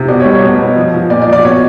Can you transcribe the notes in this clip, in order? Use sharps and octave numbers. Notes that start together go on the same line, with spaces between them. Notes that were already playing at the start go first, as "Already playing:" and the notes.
Already playing: C3
B2 D5
C#5
G3
C#5
B2
B2
F3
F3
A#2 D5
D5
F3
D5
B2 C#5